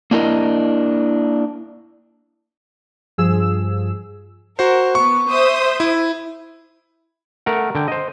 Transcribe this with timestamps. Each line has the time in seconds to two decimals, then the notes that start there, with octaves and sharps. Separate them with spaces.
0.11 A#3 D4 E4 A#4 D#5
3.18 G2 F3 G#4 E6
4.59 F#4 A#4 C5
4.95 B3 C#6
5.29 C5 E5 D#6
5.80 E4
7.46 A3 A#4 F#5
7.75 D3 G5
7.88 C5 D#5